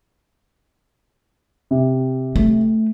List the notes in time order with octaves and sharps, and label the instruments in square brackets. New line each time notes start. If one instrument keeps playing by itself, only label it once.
[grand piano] C3
[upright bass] A3